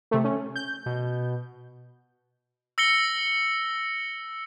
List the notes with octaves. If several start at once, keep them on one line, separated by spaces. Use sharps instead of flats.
C3 A3
C#4
G6
B2
E6 A#6 C#7 G7